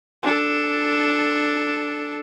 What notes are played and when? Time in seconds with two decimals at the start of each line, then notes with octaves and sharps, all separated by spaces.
0.23 D4 A4